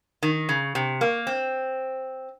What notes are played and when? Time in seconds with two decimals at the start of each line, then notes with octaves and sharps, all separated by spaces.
0.23 D#3
0.49 C#3
0.75 C3
1.01 A#3
1.27 C4